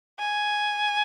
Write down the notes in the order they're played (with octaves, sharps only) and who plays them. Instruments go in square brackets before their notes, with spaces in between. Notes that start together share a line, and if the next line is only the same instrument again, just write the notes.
[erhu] G#5